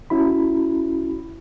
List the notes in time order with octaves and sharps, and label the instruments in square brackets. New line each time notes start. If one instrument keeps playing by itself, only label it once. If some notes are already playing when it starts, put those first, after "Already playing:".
[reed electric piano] C#4 E4 F#4 B5